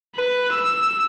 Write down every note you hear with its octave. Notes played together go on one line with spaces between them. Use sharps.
B4
E6